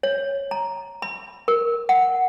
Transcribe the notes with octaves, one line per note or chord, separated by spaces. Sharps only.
C#5
A#5
B5
A#4
F#5